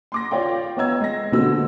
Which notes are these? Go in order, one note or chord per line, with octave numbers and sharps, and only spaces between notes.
C6 D6 A#6
F4 C#5 D5 F5 G5
B3 C#5 D#5 A#5 E6 G#6
G#3 A#6
A#1 B2 D3 C4 F#4 E6